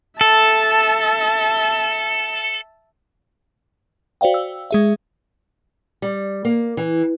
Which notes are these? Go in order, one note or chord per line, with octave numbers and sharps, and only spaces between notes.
A4 E5 A5
F#4 C5 D5 F5 G5
E6
G#3 G#4 E5
G3
A#3
E3